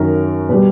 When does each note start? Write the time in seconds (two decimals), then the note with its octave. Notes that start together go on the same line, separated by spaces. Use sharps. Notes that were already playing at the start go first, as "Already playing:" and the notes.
Already playing: F#2 D#3 F#3 A#4
0.49 B2 G3 B4